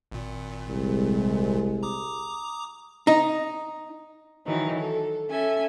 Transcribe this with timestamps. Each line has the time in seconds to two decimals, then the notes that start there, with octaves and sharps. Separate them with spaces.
0.12 G#1 A#2
0.68 C2 G#3
1.83 A#5 D6 D#6
3.07 D#4
4.46 D#3 E3 F#3 D#4
4.80 A4
5.30 C#4 A4 E5 G#5